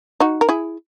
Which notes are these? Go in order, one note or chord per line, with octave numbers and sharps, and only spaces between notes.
D#4 F#4
A#4
E4 G#4